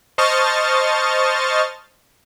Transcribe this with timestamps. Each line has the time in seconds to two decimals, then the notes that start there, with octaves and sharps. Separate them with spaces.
0.18 C5 D#5 A5 C#6 F6 A6